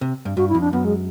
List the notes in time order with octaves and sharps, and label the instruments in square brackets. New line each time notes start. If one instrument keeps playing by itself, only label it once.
[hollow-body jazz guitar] C3
G2
[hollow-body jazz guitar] G2 [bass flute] F#4
[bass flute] E4
[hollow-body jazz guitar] F2
[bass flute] D4
[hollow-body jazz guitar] F#2 [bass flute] B3
[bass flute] G#3